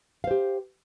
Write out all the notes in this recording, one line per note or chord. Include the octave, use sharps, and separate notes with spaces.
G4 C5 F5